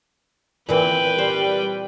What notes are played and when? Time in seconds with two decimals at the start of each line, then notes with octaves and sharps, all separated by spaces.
0.69 A#2 E3 C4 B4 G5
1.18 G3 C5